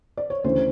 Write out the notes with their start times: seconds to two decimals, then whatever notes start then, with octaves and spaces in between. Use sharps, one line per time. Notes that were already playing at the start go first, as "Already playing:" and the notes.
0.17 D5
0.30 C#5
0.44 D2 C#3 E3 C5